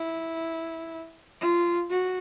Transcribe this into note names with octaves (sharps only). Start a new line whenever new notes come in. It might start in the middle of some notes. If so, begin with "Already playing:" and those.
Already playing: E4
F4
F#4